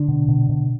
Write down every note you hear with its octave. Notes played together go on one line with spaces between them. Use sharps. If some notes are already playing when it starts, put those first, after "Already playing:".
Already playing: D3 D4
B2
B2
B2